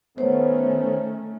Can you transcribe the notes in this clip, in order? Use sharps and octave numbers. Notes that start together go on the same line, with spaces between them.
D#3 A3 B3 C#4 C5 C#5